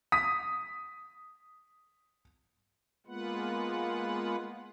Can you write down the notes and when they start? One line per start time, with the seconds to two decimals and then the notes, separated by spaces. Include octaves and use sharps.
0.12 D#6 B6
3.07 G#3 A#3 B3 F4 B4 F#5